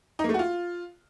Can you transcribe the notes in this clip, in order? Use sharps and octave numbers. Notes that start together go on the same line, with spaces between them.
D#4
A#3
A3
F#4
F4